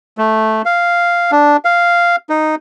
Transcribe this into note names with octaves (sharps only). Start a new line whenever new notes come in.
A3
F5
D4
F5
D#4